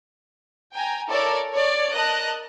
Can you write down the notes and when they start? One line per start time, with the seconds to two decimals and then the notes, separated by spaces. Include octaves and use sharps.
0.73 G5 G#5 A#5
1.08 E4 A4 A#4 C#5 D5
1.52 C#5 D5
1.91 A#4 D#5 A5 F#6